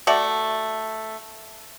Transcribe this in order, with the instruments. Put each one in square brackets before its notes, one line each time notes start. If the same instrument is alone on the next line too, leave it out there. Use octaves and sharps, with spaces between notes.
[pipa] A3 F#4 D5